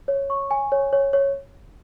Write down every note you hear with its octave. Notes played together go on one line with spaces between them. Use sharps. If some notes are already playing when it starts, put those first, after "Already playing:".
C#5
C#6
G#5
C#5
C#5
C#5